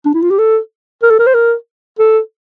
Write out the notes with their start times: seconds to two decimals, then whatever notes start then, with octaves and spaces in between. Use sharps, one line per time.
0.05 D4
0.14 E4
0.22 F4
0.30 G4
0.39 A4
1.02 A#4
1.10 A4
1.19 A#4
1.27 C5
1.34 A#4
1.99 A4